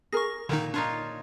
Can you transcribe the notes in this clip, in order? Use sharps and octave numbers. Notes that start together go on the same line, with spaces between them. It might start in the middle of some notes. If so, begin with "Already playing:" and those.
G#4 A#4 C#6 A#6
A#2 D3 D#3 D#4
D4 D#4 F4 C#5